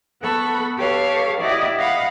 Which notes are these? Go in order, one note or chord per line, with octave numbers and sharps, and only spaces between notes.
B3 A4 F#5 B5 C#6
G4 A4 B4 C#5 F5
E4 G4 D5 D#5 F#5
D#5 F5 F#5 B5